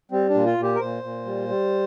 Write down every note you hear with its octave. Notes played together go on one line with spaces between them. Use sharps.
G3 C4
D4
A#2
F4
A#2
G4
A#4
A#2 C5
A#2
G3
G3